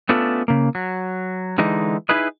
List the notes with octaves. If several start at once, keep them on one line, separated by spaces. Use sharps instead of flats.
A3 B3 C#4 D4 F4 A4
C#3 A#3
F#3
D3 E3 G#3 D#4
D#4 E4 G#4 B4 D#5